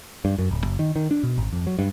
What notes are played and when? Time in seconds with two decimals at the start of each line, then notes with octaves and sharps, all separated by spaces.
0.25 G2
0.39 F#2
0.51 D1
0.64 F#1
0.79 D#3
0.96 D#3
1.11 D4
1.23 B2
1.38 G#1
1.53 F2
1.67 F#3
1.79 G2